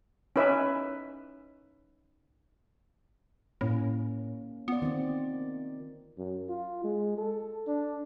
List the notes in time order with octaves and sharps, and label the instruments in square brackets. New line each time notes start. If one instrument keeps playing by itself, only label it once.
[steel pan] C#4 D#4 B4 E5
[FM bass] A2 [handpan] A#3 C#4
[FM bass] B3 [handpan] F4 D5
[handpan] D#3 C4
[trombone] F#2
F4
G#3
A4
D4